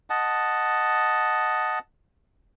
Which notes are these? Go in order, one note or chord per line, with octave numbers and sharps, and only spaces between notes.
D#5 F#5 A5